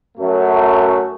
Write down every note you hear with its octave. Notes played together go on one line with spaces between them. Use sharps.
F#2 F#3 A3